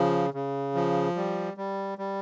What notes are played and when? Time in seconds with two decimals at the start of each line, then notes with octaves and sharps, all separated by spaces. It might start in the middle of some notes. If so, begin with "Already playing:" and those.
Already playing: C#3 F3
0.34 C#3
0.75 F3
1.16 G3
1.57 G3
1.98 G3